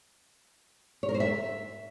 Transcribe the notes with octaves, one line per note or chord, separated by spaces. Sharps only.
C#5
A#4
C5
E5